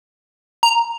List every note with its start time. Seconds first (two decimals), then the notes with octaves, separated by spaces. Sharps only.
0.63 A#5